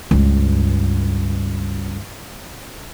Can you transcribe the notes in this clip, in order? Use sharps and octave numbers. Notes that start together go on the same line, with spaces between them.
C#2 G2